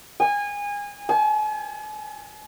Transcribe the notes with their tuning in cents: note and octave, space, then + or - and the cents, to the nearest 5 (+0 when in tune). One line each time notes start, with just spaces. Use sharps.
G#5 -25
G#5 +45